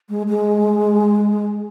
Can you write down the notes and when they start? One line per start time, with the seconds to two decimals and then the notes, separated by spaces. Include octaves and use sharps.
0.09 G#3
0.28 G#3